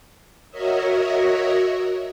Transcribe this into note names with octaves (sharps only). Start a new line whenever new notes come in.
F#4 A#4 C#5 D#5 E5